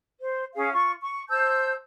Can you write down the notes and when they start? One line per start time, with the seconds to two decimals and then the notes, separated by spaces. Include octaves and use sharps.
0.20 C5
0.55 C#4 G#4 F5
0.72 F4 C#6
1.01 C#6
1.29 C5 A5 E6 G6